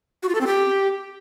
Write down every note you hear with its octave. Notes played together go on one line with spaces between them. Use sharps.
F#4
F4
A4
C4
G4